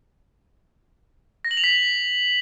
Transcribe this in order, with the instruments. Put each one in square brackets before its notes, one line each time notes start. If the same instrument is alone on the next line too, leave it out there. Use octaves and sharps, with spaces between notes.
[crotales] A#6
F#7
F7
B6